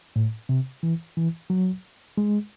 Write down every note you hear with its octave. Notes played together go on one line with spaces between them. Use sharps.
A2
C3
E3
E3
F#3
G#3